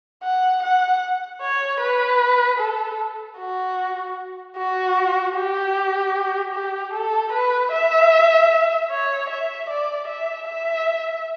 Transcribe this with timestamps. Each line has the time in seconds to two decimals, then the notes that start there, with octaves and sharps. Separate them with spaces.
0.23 F#5
0.63 F#5
1.42 C#5
1.80 B4
2.60 A4
3.39 F#4
4.57 F#4
5.36 G4
6.54 G4
6.93 A4
7.33 B4
7.72 E5
8.91 C#5
9.30 E5
9.70 D5
10.08 E5
10.48 E5